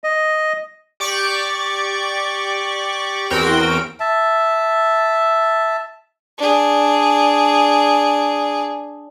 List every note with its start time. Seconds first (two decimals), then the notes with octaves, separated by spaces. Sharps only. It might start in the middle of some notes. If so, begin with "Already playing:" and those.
0.04 D#5
1.00 G4 D5 C#6 D6
3.30 E2 C4 F#4 A#4 G5 D7
4.00 E5 A5
6.38 D4 G#4